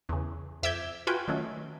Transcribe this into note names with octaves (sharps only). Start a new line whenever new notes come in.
E2 C#3
F2 E5 D6 E6 G6 G#6
F4 F#4 B4 G5 G#5
D#3 F#3 A3 C#4